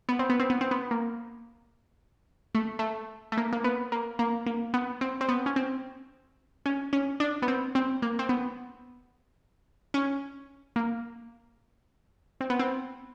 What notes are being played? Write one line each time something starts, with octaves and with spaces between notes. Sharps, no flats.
B3
C4
B3
C4
B3
C4
B3
A#3
A3
A3
A3
A#3
A#3
B3
A#3
A#3
A#3
B3
C4
C4
B3
C#4
C4
C#4
C#4
D4
B3
C4
C4
A#3
C4
B3
C#4
A#3
C4
B3
C4